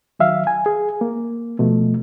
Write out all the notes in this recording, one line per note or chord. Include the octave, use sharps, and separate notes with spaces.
D#3 F#3 E5 F5
G#5
G#4
A#3
B2 F3 A3